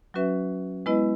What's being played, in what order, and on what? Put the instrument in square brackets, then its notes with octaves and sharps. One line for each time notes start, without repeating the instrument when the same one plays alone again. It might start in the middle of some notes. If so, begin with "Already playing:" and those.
[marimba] F#3 C#4 F#4 B4 E5
G#3 B3 E4 B4 D#5